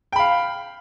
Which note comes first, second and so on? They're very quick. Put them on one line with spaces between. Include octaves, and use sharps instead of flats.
G5 B5 F5